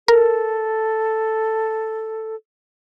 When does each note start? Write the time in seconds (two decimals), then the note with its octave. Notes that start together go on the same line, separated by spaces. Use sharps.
0.08 A4 A#4